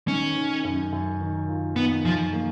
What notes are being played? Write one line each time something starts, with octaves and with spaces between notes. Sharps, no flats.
D#3 C#4
D#3
F#2
F#2
D#3
F4
D#3 B3
F#2 F3
A#3